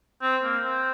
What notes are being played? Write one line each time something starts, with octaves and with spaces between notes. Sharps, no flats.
C4
A#3
C4